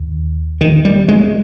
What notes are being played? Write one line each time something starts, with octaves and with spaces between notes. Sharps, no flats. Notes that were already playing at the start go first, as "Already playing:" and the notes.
Already playing: D#2
D#3
G3
G#3